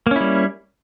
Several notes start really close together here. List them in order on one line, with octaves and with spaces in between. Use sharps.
A#3 C#4 E4 G3